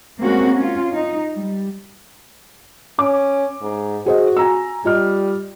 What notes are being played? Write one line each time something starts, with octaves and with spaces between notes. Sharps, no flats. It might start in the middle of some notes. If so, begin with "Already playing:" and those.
G#3 A#3 C4 C#4 F#4
C#4 F4
D#4
G3
C#4 D6
G#2
F#4 G#4 C5 D#5
G#5 A#5 E6
G3 F4 D#5 F6